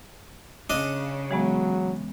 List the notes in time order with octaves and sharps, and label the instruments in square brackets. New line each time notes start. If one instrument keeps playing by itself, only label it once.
[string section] C#3 [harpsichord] D4 D#5
[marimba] E3 G#3 B3 [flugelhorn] F#3